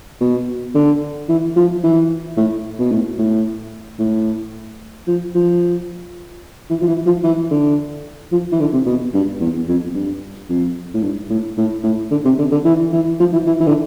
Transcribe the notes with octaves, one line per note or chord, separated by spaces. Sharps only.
B2
D3
E3
F3
E3
A2
B2
A2
A2
A2
F3
F3
E3
F3
E3
F3
E3
D3
F3
E3
D3
C3
B2
G2
E2
F2
G2
F2
A2
G2
A2
A2
A2
D3
C3
D3
D3
E3
E3
F3
E3
E3
E3
D3